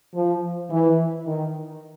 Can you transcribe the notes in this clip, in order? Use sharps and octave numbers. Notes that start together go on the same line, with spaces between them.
F3
E3
D#3